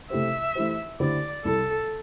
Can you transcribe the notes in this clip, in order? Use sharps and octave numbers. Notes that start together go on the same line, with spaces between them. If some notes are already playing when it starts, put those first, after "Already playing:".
C3 A3 E4 G4 C5 E5
E3 A3 E4 G4 C5
D3 A3 E4 G4 C5 D5
C2 C3 G3 E4 A4